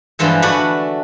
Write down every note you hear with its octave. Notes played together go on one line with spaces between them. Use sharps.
G2 D3 E3 F3 G#3
A3 D4 F#4 B4 D5 F#5